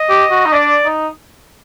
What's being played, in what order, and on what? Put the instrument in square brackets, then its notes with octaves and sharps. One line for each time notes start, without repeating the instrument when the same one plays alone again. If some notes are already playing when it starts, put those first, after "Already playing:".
Already playing: [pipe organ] D#5
[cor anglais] G4
F#4
D#4
[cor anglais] D4 [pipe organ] D5
[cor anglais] D#4